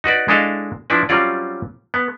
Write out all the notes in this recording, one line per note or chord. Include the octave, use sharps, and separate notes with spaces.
D#4 F#4 B4 D5
G#3 D4 E4 A4 D#5 F5
F3 D4 E4 B4
F#3 G3 C4 C#4 F4 D5
B3